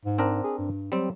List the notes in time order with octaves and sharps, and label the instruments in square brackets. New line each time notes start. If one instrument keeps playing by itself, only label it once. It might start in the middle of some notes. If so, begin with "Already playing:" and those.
[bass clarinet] G#2
[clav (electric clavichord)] C4 D4 A#4
[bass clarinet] G#4
G2
[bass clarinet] F#3 [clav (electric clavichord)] G3 C4